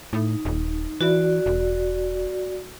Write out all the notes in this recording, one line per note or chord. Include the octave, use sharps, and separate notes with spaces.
A2 D#4
D#1
E3 F#4 D5
E1